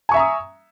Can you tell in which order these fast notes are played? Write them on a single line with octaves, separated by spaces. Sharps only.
G#5 C#6 E5 A#5 D#6